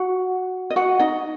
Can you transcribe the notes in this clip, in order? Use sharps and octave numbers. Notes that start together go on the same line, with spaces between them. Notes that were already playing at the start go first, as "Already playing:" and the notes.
Already playing: F#4 F#5
D#5
F#4 F#5
D#4 D#5